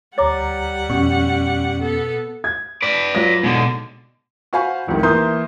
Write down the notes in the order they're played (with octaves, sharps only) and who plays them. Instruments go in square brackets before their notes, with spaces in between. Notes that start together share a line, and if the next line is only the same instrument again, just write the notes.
[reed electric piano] D2 A#5 A6 [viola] G3 F#5 [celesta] C#5 D6
[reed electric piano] F2 C#4 C#6 [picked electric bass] B2
[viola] B3 A4
[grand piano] G#6
[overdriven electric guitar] B4 D5
[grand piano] F#3 F4 A#6
[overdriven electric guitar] G#2 D3 [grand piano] B2
[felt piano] F#4 C5 F5 G#5 B5 C#6
F1 C2 G#2 D#3
E3 A#3 E5 C6 D#6 G6